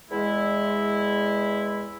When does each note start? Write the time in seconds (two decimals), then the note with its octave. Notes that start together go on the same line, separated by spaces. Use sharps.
0.11 E2 G#3 E4